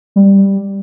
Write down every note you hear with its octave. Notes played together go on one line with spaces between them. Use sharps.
G3